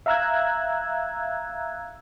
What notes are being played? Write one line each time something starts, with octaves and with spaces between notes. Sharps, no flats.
E5 F5 A#5 E6 F#6 G#6